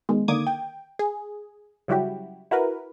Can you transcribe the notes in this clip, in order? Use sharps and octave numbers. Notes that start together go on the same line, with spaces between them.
B2 D#3 G#3
D3 D#3 A#3 D6 D#6 G#6
G5
G#4
C#3 F#3 G3 E4 F#4 G4
E4 F#4 A#4 B4